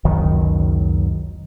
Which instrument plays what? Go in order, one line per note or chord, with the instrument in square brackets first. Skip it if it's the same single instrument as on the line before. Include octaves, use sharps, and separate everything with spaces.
[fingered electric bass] F#1 C#2 D#3 F#3